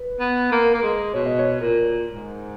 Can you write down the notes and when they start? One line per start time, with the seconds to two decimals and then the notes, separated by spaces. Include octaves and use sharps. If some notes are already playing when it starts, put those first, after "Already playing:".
Already playing: B4
0.20 B3
0.52 A#3
0.74 A#3
0.83 G#3
1.13 B2 C#5
1.26 D#5
1.39 C#5
1.61 A#2 A#4
2.08 G#2